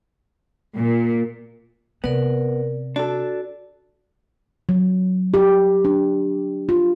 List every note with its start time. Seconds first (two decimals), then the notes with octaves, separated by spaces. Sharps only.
0.78 A#2
2.04 C3 B3 A#4 D5
2.96 D4 F#4 A4
4.69 F#3
5.34 G4
5.85 D4
6.69 F4